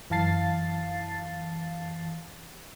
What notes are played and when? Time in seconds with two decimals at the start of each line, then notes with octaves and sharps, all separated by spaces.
0.10 F#2 E3 F5 A5 A6 C7